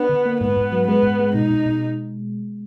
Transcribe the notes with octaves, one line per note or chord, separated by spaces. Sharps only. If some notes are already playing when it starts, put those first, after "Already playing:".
Already playing: B3 D4
D3
A#3
G#2 B3
G#2
F#3
G#3 B3
G#2
G#3
B2 D#4
B2
B2